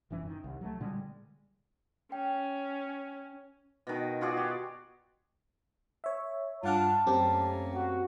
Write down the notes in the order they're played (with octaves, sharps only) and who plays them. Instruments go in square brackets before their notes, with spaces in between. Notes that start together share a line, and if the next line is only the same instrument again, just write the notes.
[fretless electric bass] E1 F#2 E3 C#4
D#3
C2
F#3 G3 A3
A#2 D3 G3 G#3
[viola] C#4 [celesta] G5
[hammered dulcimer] B2 D#3
F4 F#4 G#4 D5
G4
[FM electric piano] C#5 E5
[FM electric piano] G2 F#5 F6 [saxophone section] D4 F4 [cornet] A5
[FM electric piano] F#2 C4 G4 [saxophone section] A3 A#3 C#4
[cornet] F#4